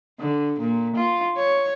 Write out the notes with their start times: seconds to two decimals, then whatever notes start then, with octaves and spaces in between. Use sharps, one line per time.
0.20 D3
0.60 A#2
0.96 F4
1.37 C#5